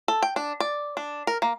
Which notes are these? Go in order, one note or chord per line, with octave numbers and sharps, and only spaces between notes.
A4
G5
D4
D5
D4
A#4
A#3